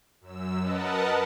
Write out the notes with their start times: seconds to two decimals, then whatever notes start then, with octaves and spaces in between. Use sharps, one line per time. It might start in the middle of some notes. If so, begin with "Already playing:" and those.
0.21 F#2 E6
0.60 A#4 B4 D#5 F#5 A5